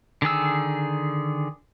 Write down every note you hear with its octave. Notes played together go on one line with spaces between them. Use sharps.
D3 D#3 G#4 E6